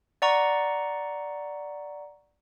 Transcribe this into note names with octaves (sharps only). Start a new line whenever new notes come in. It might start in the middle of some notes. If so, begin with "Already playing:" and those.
D5 F#5 A#5 C#6